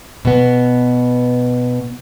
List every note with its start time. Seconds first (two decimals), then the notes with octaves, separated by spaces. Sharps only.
0.25 B2 B3